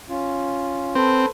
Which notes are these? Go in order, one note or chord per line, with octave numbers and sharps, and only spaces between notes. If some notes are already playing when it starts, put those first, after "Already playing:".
C#4 F4
C4 A4 B4 C5